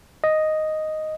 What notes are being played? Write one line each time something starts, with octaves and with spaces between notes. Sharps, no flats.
D#5